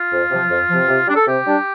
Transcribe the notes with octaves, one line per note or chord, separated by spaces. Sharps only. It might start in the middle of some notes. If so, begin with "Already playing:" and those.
Already playing: F4
F2
C3 F3
F2
C3 F3
C3
G3 D4
A4
C3 G4
G3 D4